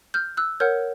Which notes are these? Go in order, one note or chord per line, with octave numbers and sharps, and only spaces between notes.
F6 G6
E6 F#6
A#4 C#5 F#5 F6 G6